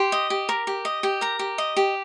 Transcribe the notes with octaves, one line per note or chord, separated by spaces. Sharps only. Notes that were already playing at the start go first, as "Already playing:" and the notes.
Already playing: G4 C6
D#5
G4
A#4
G4
D#5
G4
A#4 A#5
G4
D#5
G4